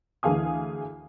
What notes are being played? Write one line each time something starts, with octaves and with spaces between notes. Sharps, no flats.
D2 E3 G#4 F5 G#5 D#6